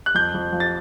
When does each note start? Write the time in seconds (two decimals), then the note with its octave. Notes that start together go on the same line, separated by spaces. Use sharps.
0.06 F#6
0.15 F2 G6
0.34 F2
0.52 F3
0.60 A6